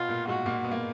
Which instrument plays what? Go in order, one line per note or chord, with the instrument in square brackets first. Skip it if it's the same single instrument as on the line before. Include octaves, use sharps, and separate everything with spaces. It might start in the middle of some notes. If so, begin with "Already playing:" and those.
Already playing: [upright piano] B2 B3 [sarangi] F4
[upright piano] A#2 A#3
[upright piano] G#2 G#3 [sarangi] F#4
[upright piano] A#2 A#3
B3
A#3